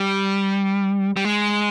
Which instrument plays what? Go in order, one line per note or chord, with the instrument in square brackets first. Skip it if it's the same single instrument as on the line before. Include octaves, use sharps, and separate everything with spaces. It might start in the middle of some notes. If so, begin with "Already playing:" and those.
Already playing: [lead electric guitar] G3
G3
G#3